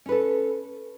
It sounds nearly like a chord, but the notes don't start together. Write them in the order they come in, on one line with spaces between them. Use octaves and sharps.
C#4 B4 A4